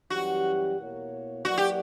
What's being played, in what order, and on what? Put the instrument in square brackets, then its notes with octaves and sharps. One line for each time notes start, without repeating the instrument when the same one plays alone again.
[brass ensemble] F#2 E3 G3 C#4 G4 [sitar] F#4
[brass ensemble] B2 A#3 E4 A#4 C#5
[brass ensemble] F#3 A#3 E4 B4 D5 [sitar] F#4
[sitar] G4